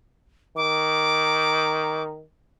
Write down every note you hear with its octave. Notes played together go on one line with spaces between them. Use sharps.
D#3 D6